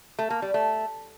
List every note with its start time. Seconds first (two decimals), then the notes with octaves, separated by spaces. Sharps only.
0.19 A3
0.30 A#3
0.42 G3
0.54 A3